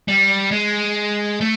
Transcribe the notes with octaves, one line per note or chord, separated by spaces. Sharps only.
G3
G#3
A3